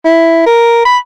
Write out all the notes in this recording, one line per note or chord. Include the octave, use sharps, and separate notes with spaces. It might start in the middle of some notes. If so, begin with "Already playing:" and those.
E4
A#4
B5